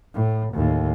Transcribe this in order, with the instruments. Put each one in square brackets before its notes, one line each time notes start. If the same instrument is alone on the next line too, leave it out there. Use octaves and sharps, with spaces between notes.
[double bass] A2
D#2 A2